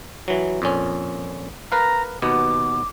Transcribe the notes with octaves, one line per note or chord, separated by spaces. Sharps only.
E3 F#3
F2 A#2 C#4
A#4 B4 F5 A#5
D#2 B2 B3 D6